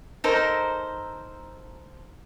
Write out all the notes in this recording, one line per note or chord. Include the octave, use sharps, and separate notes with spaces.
D#4 A4 A#4 C5